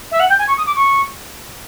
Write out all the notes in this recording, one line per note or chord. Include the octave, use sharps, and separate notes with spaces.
E5
F#5
G5
G#5
C#6
D#6
D6
C#6